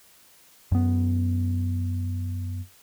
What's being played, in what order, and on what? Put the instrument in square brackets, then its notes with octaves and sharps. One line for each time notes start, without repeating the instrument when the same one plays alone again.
[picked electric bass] F#2 B3